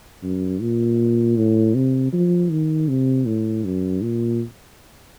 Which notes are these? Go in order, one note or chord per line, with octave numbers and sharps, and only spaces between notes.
F#2
A#2
A2
C3
F3
D#3
C3
A2
F#2
A#2